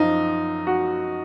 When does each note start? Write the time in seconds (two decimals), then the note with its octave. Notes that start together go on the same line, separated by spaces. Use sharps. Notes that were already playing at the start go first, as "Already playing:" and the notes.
Already playing: F#2 F3 D#4
0.67 F#4